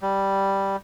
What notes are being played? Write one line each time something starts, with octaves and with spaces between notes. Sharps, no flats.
G3